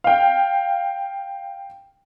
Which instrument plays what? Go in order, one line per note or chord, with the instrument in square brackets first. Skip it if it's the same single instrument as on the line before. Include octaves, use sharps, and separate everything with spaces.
[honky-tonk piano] F5 G5